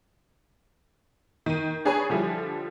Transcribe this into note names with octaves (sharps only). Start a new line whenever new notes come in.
D#3 D#7
D4 G#4 B4 C#5 G#5
D3 F3 G3 E4